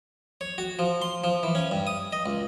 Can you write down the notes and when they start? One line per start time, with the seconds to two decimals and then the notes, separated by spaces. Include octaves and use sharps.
0.41 C#5
0.58 F#4
0.79 F3
1.02 C6
1.24 F3
1.43 E3
1.55 C#4
1.71 G2
1.87 D#6
2.13 D#5
2.26 C#2